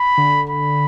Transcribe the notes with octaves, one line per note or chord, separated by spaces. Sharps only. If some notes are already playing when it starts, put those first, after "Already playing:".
Already playing: B5
D3
B5